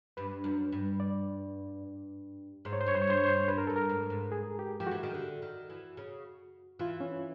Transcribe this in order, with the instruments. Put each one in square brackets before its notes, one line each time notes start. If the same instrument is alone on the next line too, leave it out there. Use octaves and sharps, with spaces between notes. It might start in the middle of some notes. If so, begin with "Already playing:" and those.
[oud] G2 [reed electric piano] B4
[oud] F#2
G2
[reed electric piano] D5
[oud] G#2 [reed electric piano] C5
[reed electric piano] C#5
C5
[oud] G2 [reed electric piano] C#5
[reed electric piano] C5
C#5
[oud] G2 [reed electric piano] C5
[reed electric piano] C#5
[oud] G2 [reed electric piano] C5
[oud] G2 [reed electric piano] B4
[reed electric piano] A#4
[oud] G2 [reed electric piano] A4
[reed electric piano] A#4
[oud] G#2
G#2
[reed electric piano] G#4
G4
[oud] F3 [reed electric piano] G4
[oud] E3 [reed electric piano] F#4
[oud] D#3
D3
D#3
E3
C#3
[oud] E3 [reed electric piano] F4
[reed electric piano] C#4